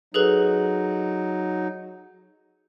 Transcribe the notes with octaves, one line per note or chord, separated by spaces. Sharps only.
F#3 D#4 G#4 A4 B4